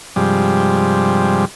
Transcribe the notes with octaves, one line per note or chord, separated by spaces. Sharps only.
G2 C3 F3 G3 G#3